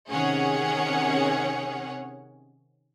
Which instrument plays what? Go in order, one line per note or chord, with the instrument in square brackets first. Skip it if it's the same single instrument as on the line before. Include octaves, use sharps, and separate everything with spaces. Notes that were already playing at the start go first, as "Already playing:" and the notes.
[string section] C3 D#3 C#4 G#4 C#5 F#5